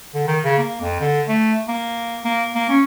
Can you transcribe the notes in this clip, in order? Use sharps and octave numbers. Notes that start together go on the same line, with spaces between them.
D3
D#3
C#3
A#3
F2
D3
A3
A#3
A#3
A#3
C#4